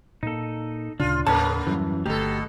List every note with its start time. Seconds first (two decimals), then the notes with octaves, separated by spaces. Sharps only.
0.23 A#2 A#3 D#4 A4
1.00 D2 A#2 C#3 D4 F4
1.27 D#2 A2 C#3 A#3 B3 B4 C#5 A5
1.67 F#2 E3 G3
2.06 G1 B2 D3 A3 G4 A4 A#5